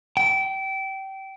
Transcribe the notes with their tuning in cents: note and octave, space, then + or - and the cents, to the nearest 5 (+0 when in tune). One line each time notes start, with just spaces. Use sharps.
G5 -25